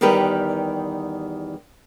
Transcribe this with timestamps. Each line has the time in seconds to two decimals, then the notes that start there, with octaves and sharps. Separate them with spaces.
0.01 E2 D#3 G3 G4 A#4 B4